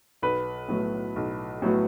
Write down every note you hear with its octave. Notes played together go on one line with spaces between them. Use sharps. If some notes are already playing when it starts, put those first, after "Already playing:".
B1 B4
A2 F#3 B3
B1
A2 F#3 B3